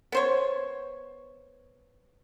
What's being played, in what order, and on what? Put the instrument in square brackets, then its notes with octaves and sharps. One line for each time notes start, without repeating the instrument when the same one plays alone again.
[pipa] B3 C5 C#5